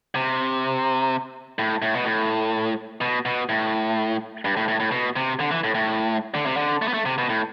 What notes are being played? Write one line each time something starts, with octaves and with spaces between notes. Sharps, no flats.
C3
A2
A2
B2
A2
B2
B2
A2
G2
A2
A2
A2
B2
C3
D3
E3
A2
A2
D3
C3
D3
A3
B3
A3
C3
B2
A2